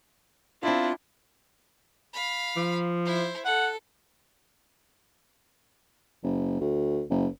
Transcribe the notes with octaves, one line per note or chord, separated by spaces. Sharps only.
C4 D4 E4 F4 F5
F5 B5
F3
E4 C5
A4 F#5
F#1
D2
F#1